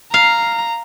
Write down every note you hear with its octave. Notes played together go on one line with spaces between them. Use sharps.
F5 A#5